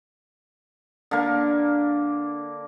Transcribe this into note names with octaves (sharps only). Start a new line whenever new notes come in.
D3 A#3